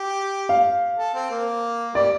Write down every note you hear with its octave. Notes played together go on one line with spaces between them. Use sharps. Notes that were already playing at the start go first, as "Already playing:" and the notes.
Already playing: G4
F5
A4
C4
A#3
G3 D5